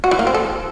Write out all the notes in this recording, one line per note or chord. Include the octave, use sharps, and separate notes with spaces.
F#4
E3
A#3
C4
A4